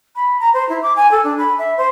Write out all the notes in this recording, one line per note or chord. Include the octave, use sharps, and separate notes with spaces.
B5
A#5
C5
E4
D6
G#5
A4
D4
B5
E5
C5